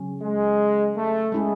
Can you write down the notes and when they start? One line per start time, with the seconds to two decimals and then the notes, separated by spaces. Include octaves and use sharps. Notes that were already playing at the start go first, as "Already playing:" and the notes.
Already playing: C#3 F#3 C#4
0.21 G#3
0.96 A3
1.32 G#3 C#4 E4 G#4